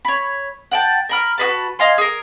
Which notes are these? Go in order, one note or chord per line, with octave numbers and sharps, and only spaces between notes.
C#5 B5
F#5 G5 A5
A#4 B5 F6
F#4 G#4 B4 A5
D#5 F5 G#5 C6
G#4 A#4